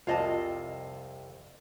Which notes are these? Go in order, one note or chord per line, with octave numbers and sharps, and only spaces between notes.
C2 F2 C3 F4 D#5 A5